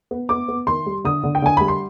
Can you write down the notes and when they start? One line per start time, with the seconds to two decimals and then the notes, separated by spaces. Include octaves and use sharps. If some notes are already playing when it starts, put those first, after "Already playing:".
0.11 B3
0.29 B3 D6
0.48 B3
0.67 D#3 C6
0.86 G3
1.04 D3 D#6
1.23 D3
1.35 G5
1.42 D3 G#5
1.57 G3 B5
1.68 C6